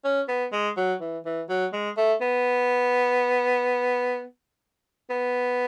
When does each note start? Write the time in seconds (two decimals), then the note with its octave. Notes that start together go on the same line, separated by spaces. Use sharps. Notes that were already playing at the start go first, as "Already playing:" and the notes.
0.05 C#4
0.29 B3
0.52 G#3
0.77 F#3
1.01 E3
1.25 E3
1.49 F#3
1.73 G#3
1.97 A3
2.21 B3
5.10 B3